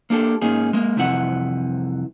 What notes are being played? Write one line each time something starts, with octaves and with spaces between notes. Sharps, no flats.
A#3 D4 G4 A4
G#2 A#3 C#4 D#4 G#4
G#3 A#3
C2 F2 C3 E3 E4 F#5